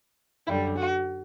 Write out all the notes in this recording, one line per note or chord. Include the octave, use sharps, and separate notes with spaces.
F#2 D3 G3 E4
F#4